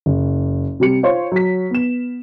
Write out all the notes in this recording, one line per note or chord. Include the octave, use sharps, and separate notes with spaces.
F#1
C3 G3 C#7
F4 C5 C#5 C6
F#3 B6
B3 E7